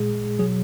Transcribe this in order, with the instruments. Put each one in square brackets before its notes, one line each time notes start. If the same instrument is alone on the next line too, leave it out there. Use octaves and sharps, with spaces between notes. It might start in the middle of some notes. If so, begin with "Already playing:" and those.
Already playing: [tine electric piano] A#2 G#3 G#4
B2 F#3 G#4